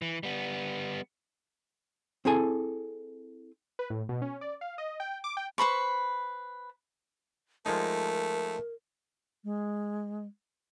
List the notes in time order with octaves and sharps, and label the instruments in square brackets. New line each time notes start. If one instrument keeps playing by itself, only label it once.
[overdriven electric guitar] E3
G3 B3
[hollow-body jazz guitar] C4 E4 G#4 A4 G#5
[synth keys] B4
A2
B2
C#4
D5
F5
D#5
G5
D6
G5
[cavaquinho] B4 C5 B5 C#6
[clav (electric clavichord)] F3 G#3 D#4 [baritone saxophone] A3 [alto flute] A#4
[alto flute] G#3